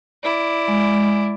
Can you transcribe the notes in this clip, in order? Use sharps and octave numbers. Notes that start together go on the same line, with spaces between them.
E4 D5
G#3